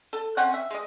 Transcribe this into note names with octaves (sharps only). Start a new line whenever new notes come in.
A4
C4 C#4 F#5
E5
G#3 D#5